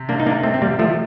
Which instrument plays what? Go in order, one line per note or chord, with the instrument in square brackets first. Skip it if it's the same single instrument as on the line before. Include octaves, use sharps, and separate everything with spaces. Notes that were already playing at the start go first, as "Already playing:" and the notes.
Already playing: [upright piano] C3
[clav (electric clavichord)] A#3 D4
D#4
A#3 D4
A3 C4
C4
G3 A#3
F3 A3